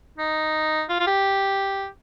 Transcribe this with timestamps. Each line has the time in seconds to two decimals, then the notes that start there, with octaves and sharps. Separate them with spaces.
0.18 D#4
0.89 F4
1.00 F4
1.07 G4